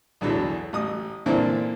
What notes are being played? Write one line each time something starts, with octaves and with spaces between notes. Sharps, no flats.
B1 E2 D3 E3 F#3 B3
A1 D#6
A#2 D3 E3 A#3 C4 E4